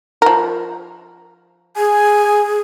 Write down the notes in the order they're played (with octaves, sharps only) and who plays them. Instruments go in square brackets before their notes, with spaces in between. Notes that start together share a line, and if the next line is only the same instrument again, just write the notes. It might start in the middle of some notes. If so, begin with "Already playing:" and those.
[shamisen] F3 A#4
[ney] G#4 [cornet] G#5